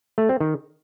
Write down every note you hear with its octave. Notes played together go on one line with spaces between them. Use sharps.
A3
C4
D#3